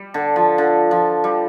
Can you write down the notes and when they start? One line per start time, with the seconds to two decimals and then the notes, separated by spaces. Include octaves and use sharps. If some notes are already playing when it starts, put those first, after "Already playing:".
Already playing: G3
0.14 D3
0.36 F3
0.58 D3
0.91 F3
1.24 G3